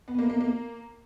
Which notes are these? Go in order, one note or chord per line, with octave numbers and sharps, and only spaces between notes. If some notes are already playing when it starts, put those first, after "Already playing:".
B3
A#3
A#3
A#3